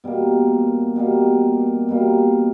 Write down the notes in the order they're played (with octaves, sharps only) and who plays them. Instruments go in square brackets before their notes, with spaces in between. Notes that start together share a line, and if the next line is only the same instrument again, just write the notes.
[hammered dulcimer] B2 G3 A#3
B2 G3 A#3
B2 G3 A#3